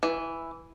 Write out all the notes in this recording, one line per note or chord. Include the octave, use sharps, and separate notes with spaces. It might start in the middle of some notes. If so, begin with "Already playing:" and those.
E3